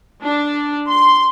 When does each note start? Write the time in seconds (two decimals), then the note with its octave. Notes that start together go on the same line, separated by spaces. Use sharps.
0.22 D4
0.88 C6